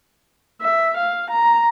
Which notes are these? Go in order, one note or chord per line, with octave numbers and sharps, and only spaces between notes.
E5
F5
A#5